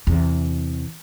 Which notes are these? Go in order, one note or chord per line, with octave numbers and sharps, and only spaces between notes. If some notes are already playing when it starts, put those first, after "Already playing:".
E2 C3